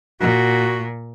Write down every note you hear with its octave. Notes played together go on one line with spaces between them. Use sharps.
A#2 F#4